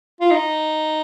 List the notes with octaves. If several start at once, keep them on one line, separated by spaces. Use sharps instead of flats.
F4
D#4